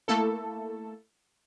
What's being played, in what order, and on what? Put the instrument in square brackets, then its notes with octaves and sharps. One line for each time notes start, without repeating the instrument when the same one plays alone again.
[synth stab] A3 A#3 E4 A4